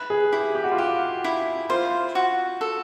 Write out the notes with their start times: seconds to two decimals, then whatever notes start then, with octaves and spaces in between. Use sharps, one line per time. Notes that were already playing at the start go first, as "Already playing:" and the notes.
Already playing: B4
0.10 G#4
0.32 E4 G4
0.55 G4
0.64 F#4
0.71 F4
0.78 F#4 G4
1.24 E4
1.69 F4 C5
2.15 F#4
2.61 A4